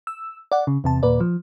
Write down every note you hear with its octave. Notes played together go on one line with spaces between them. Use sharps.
E6
D5 F#5
C#3
E2 C3 A5
D#2 A#2 B4 D5
F3